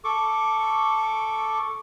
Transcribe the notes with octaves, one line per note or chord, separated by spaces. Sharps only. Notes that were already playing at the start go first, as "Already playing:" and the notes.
A4 C#6 D6